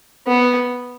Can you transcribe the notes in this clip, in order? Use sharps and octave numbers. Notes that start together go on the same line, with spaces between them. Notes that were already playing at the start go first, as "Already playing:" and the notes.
B3